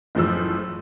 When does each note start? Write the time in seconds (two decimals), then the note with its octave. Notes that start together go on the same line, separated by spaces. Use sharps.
0.15 F#1 A2 F3 E6